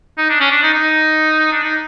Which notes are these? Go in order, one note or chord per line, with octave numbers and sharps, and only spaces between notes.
D#4
D4
C#4
D4
D#4
D#4
D4
D#4